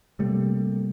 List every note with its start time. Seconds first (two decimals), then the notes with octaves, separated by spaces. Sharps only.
0.19 C3 G3 A3 A#3